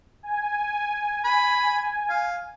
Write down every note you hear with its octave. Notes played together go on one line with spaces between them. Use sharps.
G#5
B5
F5